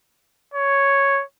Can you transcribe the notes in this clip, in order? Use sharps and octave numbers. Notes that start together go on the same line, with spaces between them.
C#5